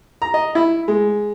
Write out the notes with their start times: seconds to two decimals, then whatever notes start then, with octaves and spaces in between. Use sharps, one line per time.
0.22 A#5
0.34 D#5
0.55 E4
0.88 G#3